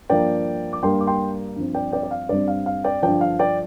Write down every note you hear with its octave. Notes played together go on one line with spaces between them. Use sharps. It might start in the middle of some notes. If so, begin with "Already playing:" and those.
G2 F3 A#3 D5 G5
D6
G2 G3 A#3 G5 C6
D6
G5 C6
G2 F3 C4
D5 G5
D5 G5
D5
F5
G2 G3 C4 D5
F5
F5
D5 G5
G2 D3 F3 D5 G5
F5
D5 G5